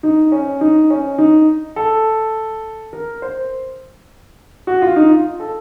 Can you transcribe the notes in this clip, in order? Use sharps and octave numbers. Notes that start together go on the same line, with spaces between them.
D#4
C#4
D#4
C#4
D#4
A4
A#4
C5
F#4
F4
D#4
F4
A4